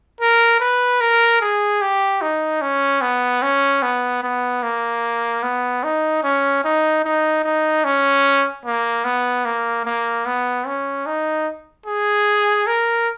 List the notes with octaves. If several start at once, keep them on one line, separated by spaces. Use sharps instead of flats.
A#4
B4
A#4
G#4
G4
D#4
C#4
B3
C#4
B3
B3
A#3
B3
D#4
C#4
D#4
D#4
D#4
C#4
A#3
B3
A#3
A#3
B3
C#4
D#4
G#4
A#4